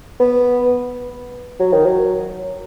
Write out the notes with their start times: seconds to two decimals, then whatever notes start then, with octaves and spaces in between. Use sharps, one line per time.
0.20 B3
1.60 F#3
1.73 D#3
1.85 F#3